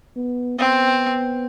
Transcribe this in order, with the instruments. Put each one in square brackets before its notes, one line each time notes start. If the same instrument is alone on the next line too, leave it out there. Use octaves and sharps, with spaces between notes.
[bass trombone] B3
[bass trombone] B3 [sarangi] C4